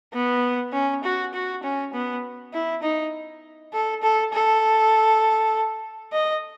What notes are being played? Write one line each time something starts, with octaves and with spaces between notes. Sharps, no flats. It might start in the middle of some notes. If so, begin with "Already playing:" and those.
B3
C#4
F#4
F#4
C#4
B3
E4
D#4
A4
A4
A4
D#5